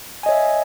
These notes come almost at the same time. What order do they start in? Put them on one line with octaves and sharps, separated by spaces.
G#5 D#5 C#5 E5